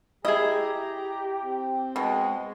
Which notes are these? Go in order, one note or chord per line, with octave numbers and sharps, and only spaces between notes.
E4 G4 G#4 D#5 A#5
C4
B2 G#3